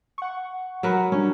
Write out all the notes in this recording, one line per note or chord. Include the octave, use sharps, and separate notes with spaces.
F#5 C#6
F#3 A#4 B4
G3 C#4 D4